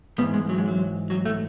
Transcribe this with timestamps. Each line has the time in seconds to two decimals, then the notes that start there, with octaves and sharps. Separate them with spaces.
0.18 G#2 B3
0.22 E3
0.34 G#3
0.49 F#3
0.58 G#3
0.68 F#3
1.10 F#3
1.25 A3